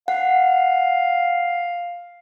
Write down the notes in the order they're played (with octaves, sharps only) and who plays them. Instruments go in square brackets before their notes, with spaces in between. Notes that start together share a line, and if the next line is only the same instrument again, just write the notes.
[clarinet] F5 [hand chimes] F#5